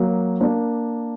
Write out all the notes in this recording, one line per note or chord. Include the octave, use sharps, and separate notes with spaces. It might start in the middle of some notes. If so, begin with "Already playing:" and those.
Already playing: F#3 A#3
A#3 D4